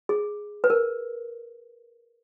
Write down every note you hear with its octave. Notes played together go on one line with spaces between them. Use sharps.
G#4
B4
A#4